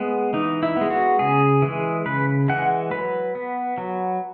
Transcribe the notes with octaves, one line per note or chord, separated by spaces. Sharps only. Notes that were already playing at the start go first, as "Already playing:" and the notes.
Already playing: G#3 B3
E3 D#4
E4
G#3 B3
F#4
C#3 G#4
E3 G#3
C#3 B4
E3 G#3 F#5
F#3 B4
B3
F#3